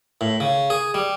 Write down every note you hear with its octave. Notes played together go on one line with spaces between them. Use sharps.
A2
C#3
G#4
G3